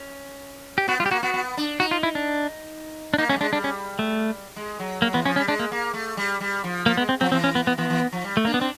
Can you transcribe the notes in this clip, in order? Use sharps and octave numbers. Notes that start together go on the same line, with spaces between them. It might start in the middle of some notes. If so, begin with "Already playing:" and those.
Already playing: C#4
G4
B3 F#4
G3 F4
G4
A#3 F#4
B3 F#4
B3
D4
D#4 F#4
F4
E4
D4
D4
A#3 D#4
A3 C#4
G3
G#3 D4
G3 D4
C#4
A3
G#3
F#3
F#3 A#3
E3 B3
F3 C#4
G3 C#4
G#3 D4
A#3
A#3
A3
G3
G3
F3
F3 A#3
G#3 B3
C4
F3 C4
E3 C4
C#4
B3
B3
E3 B3
E3
F3
G3
A3
A#3 D4
B3
C4 D4